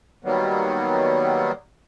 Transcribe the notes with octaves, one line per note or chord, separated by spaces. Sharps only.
D#3 F#3 G3 A#3 B3